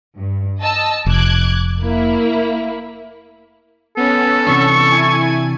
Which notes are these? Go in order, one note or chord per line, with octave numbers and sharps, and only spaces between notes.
G2
D#5 A5 E6
F1 D6 F#6 G#6
A#3 E4
B3 C#4 A4
C3 E3 D4 C#6
E4 G#5 G#6